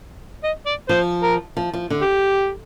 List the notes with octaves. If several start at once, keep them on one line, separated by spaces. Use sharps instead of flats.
D#5
D5
F3 C5
A#4
F3
F3
D3
G4